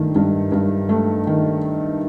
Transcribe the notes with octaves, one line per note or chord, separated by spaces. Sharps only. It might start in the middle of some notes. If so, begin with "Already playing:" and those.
Already playing: G2 D#3 A3
G2
G2
A3
D#3